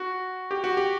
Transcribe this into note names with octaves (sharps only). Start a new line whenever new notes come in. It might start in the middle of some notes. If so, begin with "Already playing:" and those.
Already playing: F#4
G4
F#4
G4